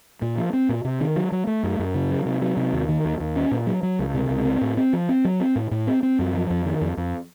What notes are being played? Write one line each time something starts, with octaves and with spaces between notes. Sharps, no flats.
A#2
F3
C4
A#2
C3
D#3
F#3
F#3
A3
F#2
F#2
C#3
F#3
C3
F#3
C3
D#2
D#3
D#2
D#2
C#4
A#2
F#3
F#3
C#2
C3
C#2
C4
A2
C4
F3
C4
F#3
C4
A2
A2
C4
C4
F#2
F3
F2
D#3
F2
F2